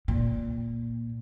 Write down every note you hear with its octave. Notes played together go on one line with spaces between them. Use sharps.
A#2